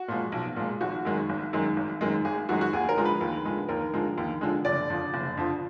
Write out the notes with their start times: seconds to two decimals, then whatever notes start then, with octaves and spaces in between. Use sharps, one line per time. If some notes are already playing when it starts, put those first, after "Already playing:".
Already playing: F#4
0.08 A#2 F3 G#3
0.32 B1
0.56 A#2 F3 G#3
0.80 G#1 F#4
1.05 F#2 D#3 G#3
1.29 G#1
1.53 F#2 D#3 G#3
1.77 G#1
2.01 F#2 D#3 G#3
2.25 G#1 G#4
2.49 F#2 D#3 G#3 F#4
2.61 F#4
2.73 D#2 G#4
2.89 A#4
2.97 D3 F3 G#3
3.05 B4
3.21 D#2
3.45 D3 F3 G#3
3.68 D#2 A#4
3.94 D3 F3 G#3
4.18 D#2
4.41 D3 F3 G#3
4.65 F#1 D5
4.90 F2 D3 F3
5.14 F#1
5.37 F2 D3 F3